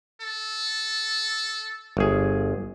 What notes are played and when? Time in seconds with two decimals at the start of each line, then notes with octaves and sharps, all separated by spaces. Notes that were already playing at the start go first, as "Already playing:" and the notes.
0.21 A4
1.97 G1 G#4